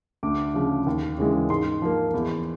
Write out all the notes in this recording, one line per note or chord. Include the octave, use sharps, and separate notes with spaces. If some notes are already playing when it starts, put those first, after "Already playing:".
D2 D6
C#3 F3
D#2
C#3 E3 G#3
G#2 C6
F3 A#3
E2